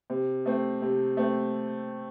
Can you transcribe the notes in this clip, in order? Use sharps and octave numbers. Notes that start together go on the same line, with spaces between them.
C3
A3 C4
C3
A3 C4